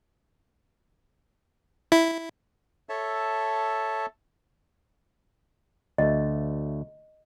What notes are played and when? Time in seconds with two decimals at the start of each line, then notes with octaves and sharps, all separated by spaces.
1.92 E4
2.89 A4 C#5 E5 A5
5.98 D2 A3 D#5